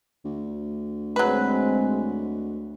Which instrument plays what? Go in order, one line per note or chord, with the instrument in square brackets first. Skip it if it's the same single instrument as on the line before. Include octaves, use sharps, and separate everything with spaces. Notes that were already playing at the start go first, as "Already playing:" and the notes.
[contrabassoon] D2
[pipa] F#3 B4 [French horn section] G#3 C4